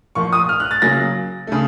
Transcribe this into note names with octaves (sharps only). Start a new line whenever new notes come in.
A#2 F3 A#3 C#6
D#6
F6
F#6
A6
C#3 F#3 A#3 A#6
C#3 A3